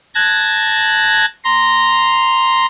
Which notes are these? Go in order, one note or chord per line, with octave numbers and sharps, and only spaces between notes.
A5 F#6 G#6 A#6
A#5 C6